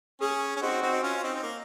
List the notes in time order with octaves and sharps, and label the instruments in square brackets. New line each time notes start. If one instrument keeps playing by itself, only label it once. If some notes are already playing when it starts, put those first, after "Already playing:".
[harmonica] C#4 [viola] G#4
[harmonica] C#4
[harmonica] C4 D#4 [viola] F#4
[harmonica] C4 D#4
D#4
C#4 F4
F4
C4 D#4
C4
A#3